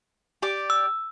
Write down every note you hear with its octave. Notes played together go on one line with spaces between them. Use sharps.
G4 D5 D6
E6